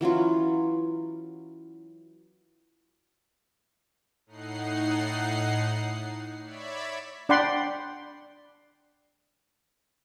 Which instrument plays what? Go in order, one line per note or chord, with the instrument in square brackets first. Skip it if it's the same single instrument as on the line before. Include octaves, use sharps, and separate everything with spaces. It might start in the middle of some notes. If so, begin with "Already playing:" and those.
[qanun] E3 F#3 C#4 F4
[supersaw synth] A2 D#4 F#5 C7
C#5 D5 E5 B5
[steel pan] D4 D5 F#5 G5 B5 C6